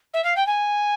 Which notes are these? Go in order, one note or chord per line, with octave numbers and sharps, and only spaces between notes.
E5
F5
G5
G#5